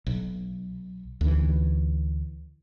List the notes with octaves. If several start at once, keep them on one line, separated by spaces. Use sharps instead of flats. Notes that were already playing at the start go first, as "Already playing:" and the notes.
B1
D2 E3